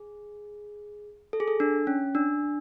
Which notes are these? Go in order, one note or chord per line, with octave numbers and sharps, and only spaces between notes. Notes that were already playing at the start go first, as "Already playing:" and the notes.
Already playing: G#4
A4
G#4
A4
D4
C#4
D4